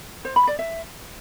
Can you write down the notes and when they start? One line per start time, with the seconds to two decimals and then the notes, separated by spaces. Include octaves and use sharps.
0.25 C5
0.36 B5
0.47 D5
0.59 E5